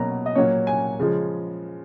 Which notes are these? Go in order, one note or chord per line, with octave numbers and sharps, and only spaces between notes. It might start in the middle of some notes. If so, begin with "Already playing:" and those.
Already playing: B2 F#3 A#3 A#5
D#5
A#2 F#3 A#3 C#5
G#5
C#3 F3 G#3